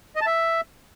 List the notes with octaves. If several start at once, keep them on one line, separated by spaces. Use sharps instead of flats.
D#5
A5
E5